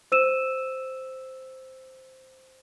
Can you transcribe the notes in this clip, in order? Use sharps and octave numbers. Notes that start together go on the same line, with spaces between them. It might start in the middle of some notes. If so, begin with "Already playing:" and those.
C5 E6 D#7 E7